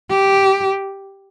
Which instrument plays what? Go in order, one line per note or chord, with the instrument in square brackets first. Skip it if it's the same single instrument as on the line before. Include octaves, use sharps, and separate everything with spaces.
[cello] G4